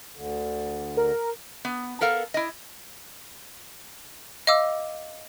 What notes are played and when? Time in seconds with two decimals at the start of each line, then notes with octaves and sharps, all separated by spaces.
0.16 D2 D3
0.97 A#4
1.65 B3
2.01 B3 A4 A#4 F5
2.34 E4 D#5
4.47 D#5 F5 D6 E6